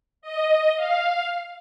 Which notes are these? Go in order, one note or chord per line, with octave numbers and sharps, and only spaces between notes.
D#5
F5